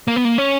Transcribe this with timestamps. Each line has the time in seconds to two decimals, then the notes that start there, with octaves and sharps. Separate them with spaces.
0.08 A#3
0.16 B3
0.25 A#3
0.38 C#4